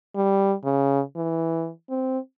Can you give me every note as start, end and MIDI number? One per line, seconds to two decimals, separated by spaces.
0.15 0.54 55
0.64 1.01 49
1.16 1.70 52
1.89 2.18 60